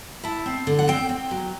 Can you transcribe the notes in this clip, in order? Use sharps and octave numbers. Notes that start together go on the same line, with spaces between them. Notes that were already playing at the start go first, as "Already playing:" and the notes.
E4 A5
C4
D3
F#5
C4 G5
C4
F#3